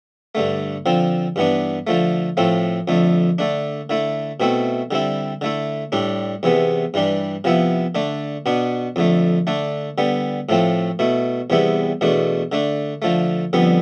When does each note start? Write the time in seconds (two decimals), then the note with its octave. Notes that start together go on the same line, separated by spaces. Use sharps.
0.35 G2 D3 A3
0.86 D3 F3 C4
1.36 G2 E3 B3 D4
1.87 D3 F3 A3
2.37 A2 F3 A3 C4
2.88 F2 D3 A3
3.38 D3 A3 D4
3.90 D3 A3 E4
4.40 B2 A3 C4 E4
4.91 D3 G3 C4 E4
5.41 D3 A3 E4
5.92 A2 G3 D4
6.43 E2 C3 E3 B3
6.94 G2 E3 G3 D4
7.44 C3 F3 B3 E4
7.95 D3 A3 D4
8.46 B2 B3 D4
8.96 F2 D3 A3
9.47 D3 A3 D4
9.98 D3 G3 B3
10.49 A2 F3 A3 C4
10.99 B2 A3 E4
11.50 E2 C3 G3 B3 E4
12.01 E2 B2 A3 D4
12.52 D3 A3 D4
13.02 D3 F3 A3
13.53 F2 D3 G3 B3